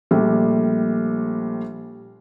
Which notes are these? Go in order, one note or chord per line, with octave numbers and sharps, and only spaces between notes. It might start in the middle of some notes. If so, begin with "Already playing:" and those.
A#1 G3 A3